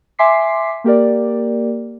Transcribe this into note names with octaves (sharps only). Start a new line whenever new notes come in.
E5 G#5 C6 D6 B6 C7
A#3 G4 A#4 D5